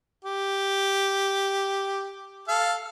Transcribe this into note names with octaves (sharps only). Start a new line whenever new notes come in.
G4
A4 F5